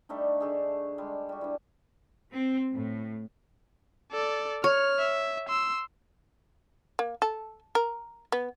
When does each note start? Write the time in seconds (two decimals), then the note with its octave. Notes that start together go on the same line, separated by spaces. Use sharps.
0.09 G3 A3 D4 D#4
0.40 D3 A3 G#4
0.98 G3 G#3
1.29 G3 F#4
1.41 E3 D4
2.31 C4
2.72 A2
4.12 A4 D5
4.64 C#5 F6
4.99 E5
5.49 C6 E6
6.99 A#3
7.22 A4
7.75 A#4
8.32 B3